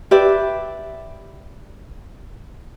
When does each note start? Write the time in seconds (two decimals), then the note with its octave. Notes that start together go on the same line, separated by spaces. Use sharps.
0.11 G4 B4 D5 E5